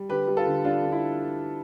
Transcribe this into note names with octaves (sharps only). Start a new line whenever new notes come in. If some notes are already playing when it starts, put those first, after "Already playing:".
Already playing: G3
D3 G4 B4
G3
F4 A4
D3
G3 D4 F4
D3
E4